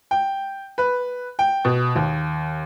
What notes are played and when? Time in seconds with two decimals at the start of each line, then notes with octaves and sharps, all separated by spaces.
0.11 G5
0.78 B4
1.39 G5
1.65 B2
1.95 D#2